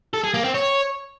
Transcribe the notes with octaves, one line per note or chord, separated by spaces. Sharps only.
A4
G#4
A#3
C4
C#5